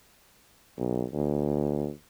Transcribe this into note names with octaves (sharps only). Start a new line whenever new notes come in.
B1
D2